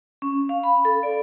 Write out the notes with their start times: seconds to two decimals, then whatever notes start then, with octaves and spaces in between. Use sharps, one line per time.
0.22 C#4
0.49 F5
0.63 B5
0.85 A4
1.03 D5